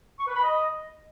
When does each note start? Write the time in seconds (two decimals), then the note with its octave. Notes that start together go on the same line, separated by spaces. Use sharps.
0.19 C#6
0.27 B4
0.35 B5
0.43 D#5